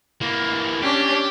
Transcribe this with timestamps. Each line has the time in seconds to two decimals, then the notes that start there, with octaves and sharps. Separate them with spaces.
0.21 E3 A#3
0.82 C#4 D4 G4